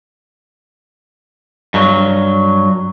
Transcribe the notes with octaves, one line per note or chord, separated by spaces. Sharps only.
G2 F#3